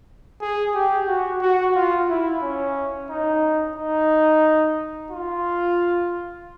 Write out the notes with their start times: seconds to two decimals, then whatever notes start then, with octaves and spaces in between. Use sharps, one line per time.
0.41 G#4
0.74 G4
1.07 F#4
1.41 F#4
1.75 F4
2.09 E4
2.42 C#4
3.10 D#4
3.76 D#4
5.11 F4